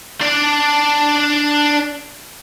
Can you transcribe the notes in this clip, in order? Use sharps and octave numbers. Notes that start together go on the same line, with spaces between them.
D4 D5